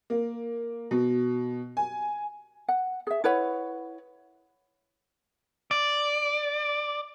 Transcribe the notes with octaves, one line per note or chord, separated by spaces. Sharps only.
A#3
B2
G#5
F#5
G#4 E5
E4 B4 C#5 F#5
D5